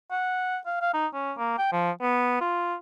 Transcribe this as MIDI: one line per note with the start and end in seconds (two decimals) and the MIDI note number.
0.11 0.58 78
0.66 0.77 77
0.81 0.90 77
0.94 1.07 63
1.14 1.32 61
1.38 1.57 58
1.58 1.70 79
1.72 1.91 53
2.02 2.39 59
2.41 2.74 65